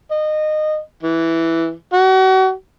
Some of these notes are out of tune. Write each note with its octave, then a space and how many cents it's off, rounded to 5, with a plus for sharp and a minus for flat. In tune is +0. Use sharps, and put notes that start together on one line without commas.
D#5 -20
E3 +0
F#4 +35